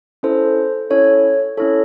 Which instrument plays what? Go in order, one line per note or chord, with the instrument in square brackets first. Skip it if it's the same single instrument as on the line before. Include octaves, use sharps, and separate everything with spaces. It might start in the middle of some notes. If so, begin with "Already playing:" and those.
[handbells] C#4 E4 A4 C5
C#4 E4 A4 C#5
C#4 E4 A4 C#5